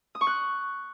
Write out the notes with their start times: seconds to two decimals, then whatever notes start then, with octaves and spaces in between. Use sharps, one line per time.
0.15 D#6
0.21 C#6
0.27 F#6